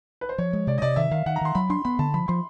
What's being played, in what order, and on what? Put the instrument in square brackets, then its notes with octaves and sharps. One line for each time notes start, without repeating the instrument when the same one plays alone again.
[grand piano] B4
C5
[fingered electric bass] F3 [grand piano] C#5
[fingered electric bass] G#3
[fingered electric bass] C3 [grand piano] D5
[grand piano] D#5
[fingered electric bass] C3 [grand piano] D5
[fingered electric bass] D#3 [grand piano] E5
[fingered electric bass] D#3 [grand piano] F5
[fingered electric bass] D#3 [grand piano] F#5
[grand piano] A#5
[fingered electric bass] D#3 [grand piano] C6
[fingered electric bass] F#3 [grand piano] B5
[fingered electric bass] D4 [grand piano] C6
[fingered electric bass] B3 [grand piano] B5
[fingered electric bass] D3 [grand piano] A5
[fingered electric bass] F3 [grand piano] B5
[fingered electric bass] F3 [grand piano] C6